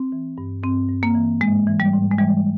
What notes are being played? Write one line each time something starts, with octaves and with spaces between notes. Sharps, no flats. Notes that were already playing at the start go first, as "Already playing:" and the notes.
Already playing: C4
E3
G2
G2 C4
G2
A#3
E3
G#2 G#3
E3
G3
G#2
G#3
E3 G3